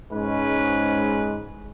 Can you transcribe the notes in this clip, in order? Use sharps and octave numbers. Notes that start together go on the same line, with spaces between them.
G#2 G#3 C#4 B4